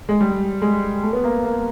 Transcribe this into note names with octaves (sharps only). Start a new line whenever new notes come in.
G#3
G3
G#3
A3
B3
A#3
A#3